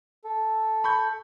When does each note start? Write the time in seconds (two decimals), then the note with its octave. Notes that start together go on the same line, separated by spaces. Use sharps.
0.24 A4
0.84 B5 C#6 G6